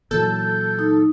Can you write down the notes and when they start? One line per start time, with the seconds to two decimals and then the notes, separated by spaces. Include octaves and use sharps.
0.11 A#2 E3 F#3 A4 G6
0.79 D#4